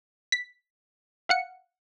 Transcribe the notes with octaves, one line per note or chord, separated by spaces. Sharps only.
B6
F5 F#5 C#7